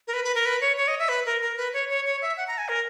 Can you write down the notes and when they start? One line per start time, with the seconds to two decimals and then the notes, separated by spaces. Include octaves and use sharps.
0.07 A#4
0.13 B4
0.25 B4
0.35 A#4
0.45 B4
0.61 C#5
0.77 C#5
0.88 D#5
0.99 E5
1.09 B4
1.26 A#4
1.42 A#4
1.57 B4
1.73 C#5
1.90 C#5
2.06 C#5
2.22 E5
2.37 F#5
2.48 A#5
2.58 G#5
2.69 A#4